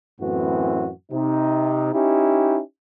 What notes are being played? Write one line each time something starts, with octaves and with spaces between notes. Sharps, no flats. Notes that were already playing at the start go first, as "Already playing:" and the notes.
F#2 A2 E3 B3 C4 F#4
C3 D#4
C#4 D#4 E4 G4